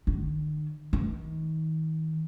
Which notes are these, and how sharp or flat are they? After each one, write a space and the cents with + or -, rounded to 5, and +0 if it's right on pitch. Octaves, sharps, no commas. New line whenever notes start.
D#3 -45
D#3 +35